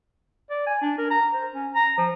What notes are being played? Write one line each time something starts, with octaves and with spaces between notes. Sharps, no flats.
D5
G#5
D4
A#4
A#5
C5
C#4
A#5
F3